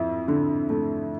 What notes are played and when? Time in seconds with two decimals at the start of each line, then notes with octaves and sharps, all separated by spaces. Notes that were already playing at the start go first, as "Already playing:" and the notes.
Already playing: F2 E4
0.28 D3
0.70 A3